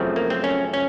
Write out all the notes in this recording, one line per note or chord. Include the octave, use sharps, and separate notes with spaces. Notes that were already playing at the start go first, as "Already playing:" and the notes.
Already playing: F#2 C#3 F3 A3 C4
A#3
C4
C#4
C#4